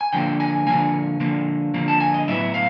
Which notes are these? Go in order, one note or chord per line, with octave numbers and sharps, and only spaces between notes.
G#5
D3 F3 A#3 G5
G#5
D3 F3 A#3 G#5
D3 F3 A#3
D3 F3 A#3
A5
G#5
D#5
A2 F#3 B3 E4 E5
F5